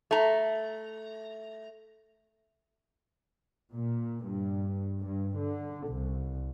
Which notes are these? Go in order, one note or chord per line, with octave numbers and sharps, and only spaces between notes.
A3 A#5
A#2
G2
G2
D3
C2